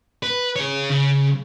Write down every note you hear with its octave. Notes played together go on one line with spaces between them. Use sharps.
B4
G#4 C#5
C#3